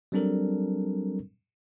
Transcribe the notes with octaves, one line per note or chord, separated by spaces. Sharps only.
F#3 G3 C4 D4 A4 A#4